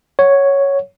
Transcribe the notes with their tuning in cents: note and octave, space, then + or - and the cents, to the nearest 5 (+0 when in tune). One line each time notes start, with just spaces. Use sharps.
C#5 +0 F#5 +0